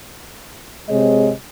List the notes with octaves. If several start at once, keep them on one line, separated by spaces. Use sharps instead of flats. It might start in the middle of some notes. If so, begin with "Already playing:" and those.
C3 G#3 C4 G#4 C#5 D#5